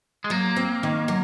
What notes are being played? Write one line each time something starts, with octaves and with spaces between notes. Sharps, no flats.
G#3
F#3 A#3
C4
D#3
F#3